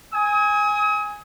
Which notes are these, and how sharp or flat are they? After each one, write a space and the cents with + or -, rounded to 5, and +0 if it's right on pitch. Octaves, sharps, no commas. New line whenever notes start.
G#5 -10 D#6 +40